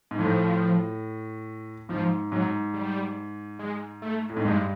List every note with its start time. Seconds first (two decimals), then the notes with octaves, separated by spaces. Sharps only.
0.11 G#2
0.19 A2 F3
1.89 G#2 F3
2.32 G#2 F#3
2.74 G3
3.59 G#3
4.02 A3
4.30 A2
4.37 G#2
4.45 G2 G#3